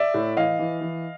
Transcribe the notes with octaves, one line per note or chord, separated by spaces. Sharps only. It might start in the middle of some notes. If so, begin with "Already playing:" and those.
Already playing: D5 E5
A2
E3 D#5 F5
E3
E3